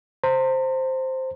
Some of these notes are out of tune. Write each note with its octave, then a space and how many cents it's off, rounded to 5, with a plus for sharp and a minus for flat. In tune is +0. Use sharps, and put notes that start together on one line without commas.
C5 +0 A#5 -40